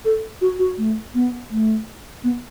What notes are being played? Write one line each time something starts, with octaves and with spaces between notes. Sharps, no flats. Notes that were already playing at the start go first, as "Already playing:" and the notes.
A4
F#4
F#4
A3
B3
A3
B3